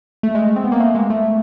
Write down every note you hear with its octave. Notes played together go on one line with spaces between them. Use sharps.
A3
G#3
C4
B3
A#3
A3
G#3
A3